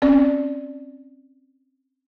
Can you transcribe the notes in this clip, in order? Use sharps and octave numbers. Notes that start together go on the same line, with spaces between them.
C4 C#4 D5